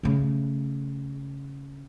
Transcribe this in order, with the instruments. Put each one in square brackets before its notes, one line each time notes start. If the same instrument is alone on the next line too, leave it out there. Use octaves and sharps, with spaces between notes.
[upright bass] C#3 A3